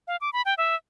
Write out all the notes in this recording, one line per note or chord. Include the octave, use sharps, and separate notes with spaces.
F5
D6
B5
G5
E5